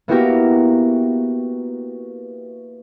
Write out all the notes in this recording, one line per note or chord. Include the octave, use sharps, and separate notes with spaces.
A#3 B3 E4 F#4 G4 A#4